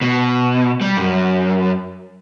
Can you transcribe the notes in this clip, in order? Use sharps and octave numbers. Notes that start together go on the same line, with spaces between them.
B2
G3
F#2